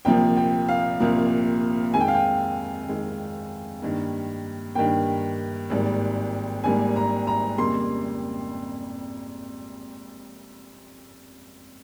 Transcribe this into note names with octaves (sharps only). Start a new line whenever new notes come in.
C2 A#2 F3 A#3 G5
G5
F5
C2 A#2 F3 A#3
F2 D#3 G#3 G#5
G5
F5
G5
F2 D#3 G#3
G2 D#3 A#3
G2 D#3 A#3 G5
G#1 G#2 G3 A#3
G#1 G#2 G3 A#3 G#5
A#5
A#5
F2 C#3 G3 A#3 C6